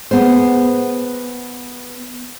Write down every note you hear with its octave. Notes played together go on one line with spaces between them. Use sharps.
B3 G#4 C5